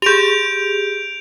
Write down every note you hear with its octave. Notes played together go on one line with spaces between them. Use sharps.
G4 G#4 G6 D7 F7